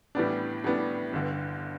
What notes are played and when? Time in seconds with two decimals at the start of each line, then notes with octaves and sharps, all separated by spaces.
0.15 A2 E3 G3 B3 D4
0.64 A2 E3 G3 B3 D4
1.13 G1 G2 D3